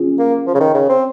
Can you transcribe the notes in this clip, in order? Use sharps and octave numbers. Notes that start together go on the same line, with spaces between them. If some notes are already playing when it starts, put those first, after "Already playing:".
Already playing: C#4 F4 G#4
A#3
F3
C#3
D#3
C#3
C4